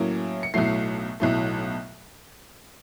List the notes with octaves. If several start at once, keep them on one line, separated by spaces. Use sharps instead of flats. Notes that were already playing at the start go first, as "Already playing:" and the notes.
Already playing: A2 F#3 A#3 C#4
C#7
B1 A2 F#3 A3 C7
B1 A2 F#3 A3